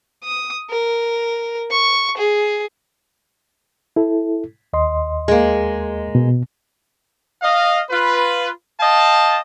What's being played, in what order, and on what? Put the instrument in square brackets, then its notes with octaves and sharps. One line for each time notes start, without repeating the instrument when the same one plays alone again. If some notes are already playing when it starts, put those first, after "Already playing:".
[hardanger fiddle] D#6
A#4
C#6
G#4
[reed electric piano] E4 A4
D#2 D#5 C6
[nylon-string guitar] G#3 A#3
[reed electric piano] B2
[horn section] D#5 F5
F4 B4
D#5 F5 G5 A5